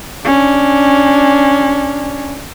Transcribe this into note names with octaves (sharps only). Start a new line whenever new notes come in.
C#4 D4